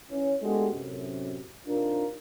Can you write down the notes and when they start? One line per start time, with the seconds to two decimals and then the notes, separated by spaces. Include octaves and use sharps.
0.11 E3 C#4
0.42 G#3 A3 B3 D4 F#4 G4
0.73 F#2 A2 C3
1.67 C3 D4 D#4 F4 A#4